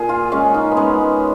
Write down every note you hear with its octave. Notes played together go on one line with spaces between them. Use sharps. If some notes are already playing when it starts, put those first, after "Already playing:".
Already playing: A#2 G#4
F4
G#3 C#4
D#4
B3
G#3 C#4